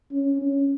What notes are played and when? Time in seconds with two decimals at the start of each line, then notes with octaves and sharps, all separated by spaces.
0.12 C#4
0.42 C#4